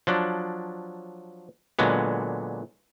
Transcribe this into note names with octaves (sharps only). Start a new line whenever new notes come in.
F3 F#3 D4
A#2 D3 F#3 G#3 B3